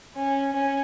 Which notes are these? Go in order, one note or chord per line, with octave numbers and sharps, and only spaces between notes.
C#4
C#4